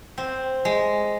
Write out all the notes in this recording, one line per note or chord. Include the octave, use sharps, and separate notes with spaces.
C4
G#3